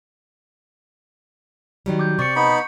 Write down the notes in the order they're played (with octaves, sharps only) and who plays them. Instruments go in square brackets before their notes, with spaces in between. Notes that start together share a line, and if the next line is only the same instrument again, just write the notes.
[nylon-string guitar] D#3 F#3 G3
[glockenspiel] D6 G6
[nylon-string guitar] C3 [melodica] D5 [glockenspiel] C#6 C#7
[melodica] B3 D#4 B5